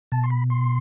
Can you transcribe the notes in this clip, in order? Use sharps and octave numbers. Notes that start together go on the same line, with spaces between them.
B2 A5
C6
B5
C6